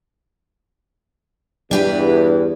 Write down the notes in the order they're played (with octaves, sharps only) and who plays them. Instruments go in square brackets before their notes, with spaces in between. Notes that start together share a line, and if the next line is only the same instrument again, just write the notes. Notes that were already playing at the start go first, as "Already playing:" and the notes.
[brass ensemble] E2 G2 [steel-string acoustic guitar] D4 G4 B4